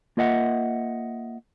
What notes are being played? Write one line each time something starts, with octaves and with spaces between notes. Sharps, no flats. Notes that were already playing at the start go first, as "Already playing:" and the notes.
A#3 F4 A#4 D#5 E5 F#5